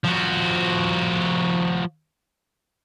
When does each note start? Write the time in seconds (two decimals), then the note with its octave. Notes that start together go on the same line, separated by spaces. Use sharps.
0.04 F3 F#4